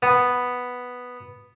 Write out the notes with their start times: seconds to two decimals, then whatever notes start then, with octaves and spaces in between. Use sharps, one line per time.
0.03 B3